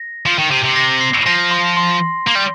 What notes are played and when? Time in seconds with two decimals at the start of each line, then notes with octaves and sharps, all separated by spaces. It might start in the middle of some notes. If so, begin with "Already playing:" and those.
Already playing: A#6
0.26 F3
0.38 D#3
0.51 C3
0.64 C3 C7
0.76 A#6
1.01 C7
1.26 F3 A#6
1.51 C6
1.77 C6
2.27 A#3
2.35 G3